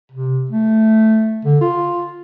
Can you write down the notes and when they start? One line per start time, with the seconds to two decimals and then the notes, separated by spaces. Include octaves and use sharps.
0.11 C3
0.50 A3
1.45 D3
1.61 F4